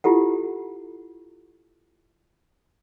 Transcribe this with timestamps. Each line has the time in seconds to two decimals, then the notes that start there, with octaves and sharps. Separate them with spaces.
0.04 E4 F4 G4 A4 F#5